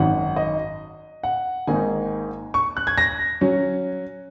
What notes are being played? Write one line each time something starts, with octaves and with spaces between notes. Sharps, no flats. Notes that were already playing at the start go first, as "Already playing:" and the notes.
Already playing: G#1 F#2 D#3 F#5
D#5
F#5
G#1 G#2 D#3 A#3 D#4 G#5
C#6
F#6
G#6
A#6
F#3 C#4